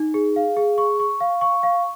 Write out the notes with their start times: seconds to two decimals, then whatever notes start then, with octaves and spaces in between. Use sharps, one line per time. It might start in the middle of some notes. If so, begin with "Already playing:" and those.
Already playing: D#4
0.14 G#4
0.36 F5
0.57 G#4
0.78 C#6
1.00 C#6
1.21 F5
1.41 C#6
1.63 F5